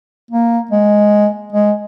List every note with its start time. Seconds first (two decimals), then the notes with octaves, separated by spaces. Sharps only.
0.31 A#3
0.71 G#3
1.53 G#3